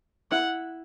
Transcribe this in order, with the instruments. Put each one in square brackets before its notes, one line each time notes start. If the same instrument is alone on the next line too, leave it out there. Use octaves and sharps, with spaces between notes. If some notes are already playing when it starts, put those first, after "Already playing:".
[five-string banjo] E4 [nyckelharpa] F#5